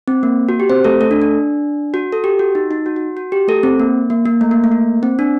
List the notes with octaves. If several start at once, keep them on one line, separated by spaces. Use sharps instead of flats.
C4
A#3
F#4
G4
C4 C5
A3 A4
A3 A4
D4
D4
F#4
A4
G4
F#4
D#4
D#4
F#4
F#4
F#4
G4
A3 A4
C4
A#3
A#3
A#3
A3
A#3
A3
A#3
C4
D4